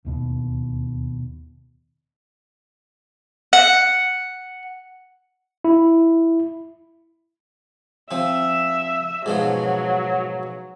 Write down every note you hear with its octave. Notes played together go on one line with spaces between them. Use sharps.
D1 D#2 B2
F#5
E4
F3 C4 E5
G#2 B2 F3 F#3